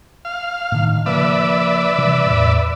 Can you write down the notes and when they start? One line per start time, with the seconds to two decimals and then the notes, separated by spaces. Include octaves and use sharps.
0.25 F5
0.72 A2 D3 D#3
1.06 C#3 F3 A#3 B4 D5 E5
1.99 C3 E3 G3
2.26 E2 A2